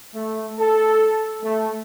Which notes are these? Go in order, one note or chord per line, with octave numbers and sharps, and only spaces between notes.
A3
A4
A3